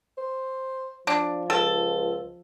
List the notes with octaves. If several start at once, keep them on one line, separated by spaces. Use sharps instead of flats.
C5
F3 D4
C#2 A4